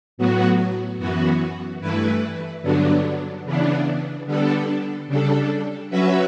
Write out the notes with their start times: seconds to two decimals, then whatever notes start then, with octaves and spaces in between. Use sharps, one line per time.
0.18 A2 F#3 B3 F#4
0.98 F#2 E3 B3 F#4
1.81 G2 E3 A3 E4 B4
2.62 G2 D3 F#3 B3 D4
3.45 C#3 E3 B3 D4
4.26 D3 G3 B3 D4 A4
5.07 C#3 G3 D4 A4
5.90 F#3 C#4 F#4 B4 E5